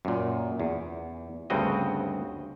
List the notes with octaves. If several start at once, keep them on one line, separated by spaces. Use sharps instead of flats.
F#2 A#2
E2
D2 G2 C#3 C4 F#4 D#5